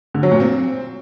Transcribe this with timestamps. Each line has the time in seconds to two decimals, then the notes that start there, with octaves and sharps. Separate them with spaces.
0.14 D3
0.23 F#3
0.32 A#2
0.40 C4